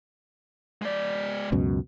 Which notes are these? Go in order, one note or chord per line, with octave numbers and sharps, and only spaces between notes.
G#3 D5
C#2 F#2 B2